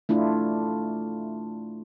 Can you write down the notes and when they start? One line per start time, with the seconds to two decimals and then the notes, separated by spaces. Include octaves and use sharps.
0.09 A3 D4 E4 F4